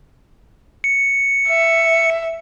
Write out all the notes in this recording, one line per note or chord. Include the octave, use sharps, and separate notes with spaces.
C#7
E5